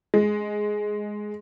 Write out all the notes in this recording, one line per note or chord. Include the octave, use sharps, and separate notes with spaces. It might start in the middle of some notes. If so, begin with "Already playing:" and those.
G#3